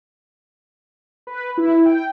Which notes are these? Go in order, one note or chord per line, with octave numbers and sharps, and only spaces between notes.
B4
E4
G5